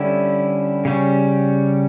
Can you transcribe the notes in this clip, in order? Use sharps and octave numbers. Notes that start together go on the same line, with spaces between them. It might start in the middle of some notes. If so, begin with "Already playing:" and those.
Already playing: D3 G3 C#4 E4
C#3 G3 C#4